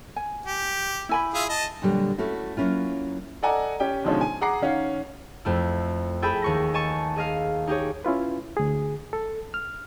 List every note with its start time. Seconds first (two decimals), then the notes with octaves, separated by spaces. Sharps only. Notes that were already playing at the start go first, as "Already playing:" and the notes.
0.16 G#5
0.46 G4
1.09 E4 G#5 B5
1.34 F4 G#4 E5
1.49 D#5 A5
1.82 A#2 D3 F#3 G3
2.18 A3 C#4 E4 F#4
2.57 F#3 A#3 C#4 E4 F4
3.42 A4 D5 D#5 F#5 G#5 A#5
3.80 C#4 G4 G5
4.04 B2 D3 D#3 F3 G#3 C#4
4.21 G#5
4.41 G#4 F#5 A#5 D6 C7
4.61 D#3 C#4 F5 F#5
5.45 F2 A3 E4
6.22 E4 G#4 A4 G5 A5 B5
6.42 D#2 C#6 A#6
6.74 D#5 G#5 A5 C#6
7.16 G#4 D#5 F5
7.67 D#4 G4 G#4 C#5
8.05 C#4 E4 F4 B4
8.57 D2 G#4
9.13 A4
9.54 F6